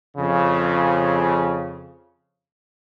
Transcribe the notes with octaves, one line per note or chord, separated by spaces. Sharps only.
F2 C#3